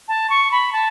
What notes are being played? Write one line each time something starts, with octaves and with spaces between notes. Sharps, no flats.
A5
C#6
B5
A5